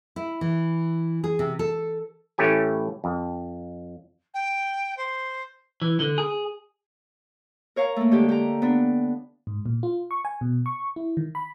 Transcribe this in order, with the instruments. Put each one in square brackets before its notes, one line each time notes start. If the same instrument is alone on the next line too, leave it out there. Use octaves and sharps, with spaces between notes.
[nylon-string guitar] E4
E3
G#4
C3
A4
[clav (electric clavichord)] A2 E3 A3 C#4 G4 G#5
F2
[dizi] G5
C5
[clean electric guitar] E3
D3
G#4
[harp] A#4 C#5 F5 A#5
A3 A#3
D3 G#3 G4
G4 A#5
B3 D4
[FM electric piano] G#2
A#2
F4
C#6
G#5
B2
C#6
E4
D#3
B5